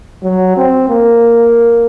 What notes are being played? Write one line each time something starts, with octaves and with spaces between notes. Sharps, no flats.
F#3
C4
A#3